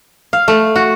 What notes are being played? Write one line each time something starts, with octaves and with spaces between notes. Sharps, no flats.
F5
A3
F#4